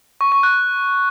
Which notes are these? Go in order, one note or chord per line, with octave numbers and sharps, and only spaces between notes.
C#6
C#6
F#6